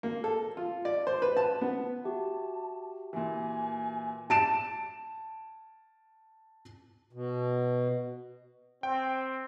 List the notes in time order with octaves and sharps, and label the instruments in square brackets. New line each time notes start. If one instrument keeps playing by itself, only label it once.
[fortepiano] A#3
A4
F4
D5
C5
B4
A5
B3
[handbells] F#4 G4 E5 [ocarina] A5
[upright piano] A#2 E3 [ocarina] G#5
[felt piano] A5 D7 E7
[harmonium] B2
[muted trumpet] C4 [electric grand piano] G5